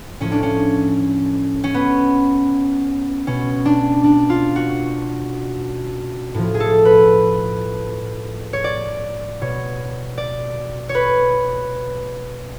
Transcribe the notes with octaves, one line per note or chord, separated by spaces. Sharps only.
A2 F3 C#4
D4
C#4
C#4
B3
B2 C#4
D4
D4
F4
F#4
A2 F3
G#4
A4
B4
C#5
D5
B2 C#5
D5
C#5
B4